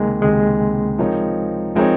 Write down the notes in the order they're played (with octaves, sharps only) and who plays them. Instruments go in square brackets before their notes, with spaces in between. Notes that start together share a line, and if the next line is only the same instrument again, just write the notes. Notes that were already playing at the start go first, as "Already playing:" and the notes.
Already playing: [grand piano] C#2 C3 D#3 [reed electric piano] G#3 A#3
[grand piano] C#2 C3 D#3 [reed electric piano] G#3
[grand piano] F3 C4 D#4 A#4 C#5
[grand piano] F3 C4 D#4 A#4 C#5 [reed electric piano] G#3